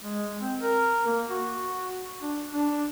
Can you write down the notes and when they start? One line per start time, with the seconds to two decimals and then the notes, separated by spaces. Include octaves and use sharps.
0.03 G#3
0.40 C4
0.61 A#4
1.07 A#3
1.30 F#4
2.22 D4
2.53 D4